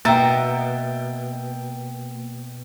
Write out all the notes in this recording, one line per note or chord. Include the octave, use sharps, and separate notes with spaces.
B2 A#3 E5 G5 A#5 A6